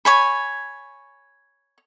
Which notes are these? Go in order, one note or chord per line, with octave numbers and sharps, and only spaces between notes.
C#5 G#5 B5